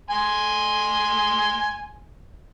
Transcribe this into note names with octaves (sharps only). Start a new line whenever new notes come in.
G#5 C6